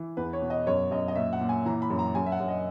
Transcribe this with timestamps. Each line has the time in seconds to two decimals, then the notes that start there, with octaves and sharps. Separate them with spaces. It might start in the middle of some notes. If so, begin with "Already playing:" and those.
Already playing: E3
0.17 E2 B4
0.33 C#5
0.42 B2
0.50 D#5
0.67 F#2 C#5
0.91 F#2 D#5
1.08 D#5
1.16 A#2 E5
1.33 F#5
1.41 A#2
1.49 G#5
1.66 E3 A#5
1.82 B5
1.90 F#2
1.99 A#5
2.15 F#2 G#5
2.26 E5
2.32 F#5
2.40 F#2
2.48 D#5